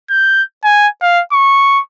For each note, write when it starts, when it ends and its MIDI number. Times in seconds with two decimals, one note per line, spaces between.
0.10 0.43 91
0.64 0.88 80
1.02 1.22 77
1.32 1.80 85